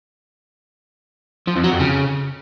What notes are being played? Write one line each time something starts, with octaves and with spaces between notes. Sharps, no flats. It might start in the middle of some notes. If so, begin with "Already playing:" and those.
F3
F2
F#3
F2
C#3